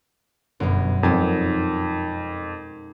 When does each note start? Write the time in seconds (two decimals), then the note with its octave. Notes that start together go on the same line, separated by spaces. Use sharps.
0.60 G1 F#2 B2
1.03 F2 G#3 D#4 A#4